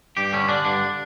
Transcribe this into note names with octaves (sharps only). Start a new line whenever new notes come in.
G2 G4
D3 C#4
D3 D4
G2 D4